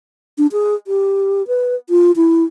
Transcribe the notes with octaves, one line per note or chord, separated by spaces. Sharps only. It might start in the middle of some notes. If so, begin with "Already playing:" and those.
D4
G#4
G4
B4
F4
E4